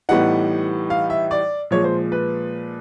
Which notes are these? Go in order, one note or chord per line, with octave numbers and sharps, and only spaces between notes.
A2 E3 G3 B3 D#4 F#5
F5
E5
D5
A#2 F3 G#3 C#5
C5
B4